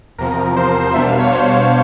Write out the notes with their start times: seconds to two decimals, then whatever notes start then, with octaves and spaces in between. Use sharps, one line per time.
0.18 E2 C3 F3 A#4
0.56 E2 C3 F3 C5
0.69 C5
0.81 C5
0.94 B2 G3 B3 D4 E5
1.07 F5
1.19 C#5
1.32 B2 G3 B3 D4 C5